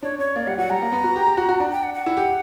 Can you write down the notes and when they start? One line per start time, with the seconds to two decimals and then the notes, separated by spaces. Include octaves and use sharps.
0.02 D4 C#5
0.18 C#4 C#5
0.36 A#3 D5
0.47 G3 F#5
0.58 F#3 F#5
0.70 G3 A#5
0.82 A#3
0.92 B3
1.04 F#4
1.16 G4
1.27 G4
1.37 F#4
1.49 F#4
1.60 D4
1.72 G5
1.83 F#5
1.94 F#5
2.06 E4
2.17 G4